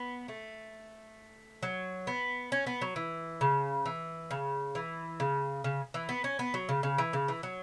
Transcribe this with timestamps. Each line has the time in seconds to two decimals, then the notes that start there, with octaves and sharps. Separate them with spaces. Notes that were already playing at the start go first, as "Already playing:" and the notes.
Already playing: B3
0.28 A3
1.63 F#3
2.07 B3
2.52 C#4
2.67 B3
2.81 F#3
2.96 E3
3.41 C#3
3.86 E3
4.31 C#3
4.75 E3
5.20 C#3
5.64 C#3
5.94 E3
6.09 B3
6.24 C#4
6.39 B3
6.54 F#3
6.69 C#3
6.83 C#3
6.98 E3
7.13 C#3
7.28 E3
7.43 F#3